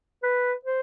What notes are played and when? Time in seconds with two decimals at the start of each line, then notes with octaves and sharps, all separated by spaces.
0.23 B4
0.65 C5